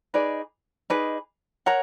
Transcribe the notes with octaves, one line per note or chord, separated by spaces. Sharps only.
D#4 G#4 B4 D5
D#4 G#4 B4 D5
A#4 C#5 F#5 A#5